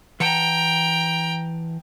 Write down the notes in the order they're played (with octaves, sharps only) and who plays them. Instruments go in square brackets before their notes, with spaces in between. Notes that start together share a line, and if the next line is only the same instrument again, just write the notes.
[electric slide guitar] E3 F#5 A5 [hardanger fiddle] G5 A#5